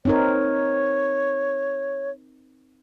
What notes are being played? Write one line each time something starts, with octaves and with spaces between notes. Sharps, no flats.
C4 D#4 A#4 C#5